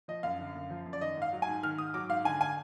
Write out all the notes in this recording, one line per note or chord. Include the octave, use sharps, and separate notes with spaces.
F3 D#5
F#2 F5
D3
F#2
F3
F#2
D5
D#3 D#5
G#2 F5
F#3
G#5
G#2
D#3 F6
G#2 D#6
F#3 D6
G#2 F5
D3 G#5
G#5